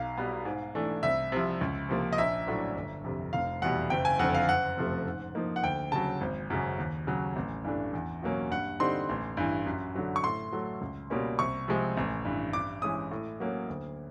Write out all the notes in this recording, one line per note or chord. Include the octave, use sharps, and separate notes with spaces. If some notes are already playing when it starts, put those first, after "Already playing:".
Already playing: B1 F5
B2 G3 B3
G#2
E3 A3 D4
C2 E5
C3 F3
C#2
C3 F3 A#3
D#5
A#1 E5
A2 F#3 A3 D4
G1
F2 C3
F1 F5
E2 B2 G3 F#5
F#1 G5
G#5
F2 D3 F#5
F5
F#1 F#5
F2 C3 F3 A3
G#2
F3 A#3 D#4
F#5
D2 G5
C#3 F#3 A5
G#1
F#2 C#3
D#2
C#3 F#3
A1
G2 E3 A3 D4
E2
B2 F#3 A#3 C#4
G2 F#5
D3 G3 C4 D#4 C6
A1
G2 E3
F#2
D3 F#3
C#6
A2 C6
F#3 A3
C#2
B2 G3 A#3 C#4
C2 C#6
C3 F3 G#3 C4
A1
G2 E3
G2 D6
E3 G#3 C#4 D#6
A2
F#3 A#3 C#4
D2